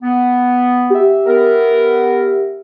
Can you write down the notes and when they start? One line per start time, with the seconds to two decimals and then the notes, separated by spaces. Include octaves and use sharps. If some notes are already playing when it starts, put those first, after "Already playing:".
0.02 B3
0.90 G4 E5
1.26 B3 A#4